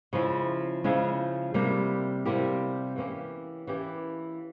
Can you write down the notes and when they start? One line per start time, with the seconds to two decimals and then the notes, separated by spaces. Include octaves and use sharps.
0.13 C#3 F3 G#3 C#4 E4
0.84 C#3 F3 G#3 C#4 E4
1.54 C3 G3 A#3 E4 G4
2.25 C3 G3 A#3 E4 G4
2.96 E3 A#3 C#4 G4
3.67 E3 A#3 C#4 G4